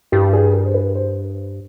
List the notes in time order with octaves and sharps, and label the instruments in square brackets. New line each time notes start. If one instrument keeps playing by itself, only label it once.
[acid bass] G2 [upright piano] G4
[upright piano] G#4
A#4
C5
B4
C5